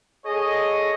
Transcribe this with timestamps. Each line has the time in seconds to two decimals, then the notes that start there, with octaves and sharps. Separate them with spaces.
0.25 G#4 A4 C#5 D#5